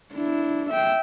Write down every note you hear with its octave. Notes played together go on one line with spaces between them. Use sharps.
D4 E4
E5 G5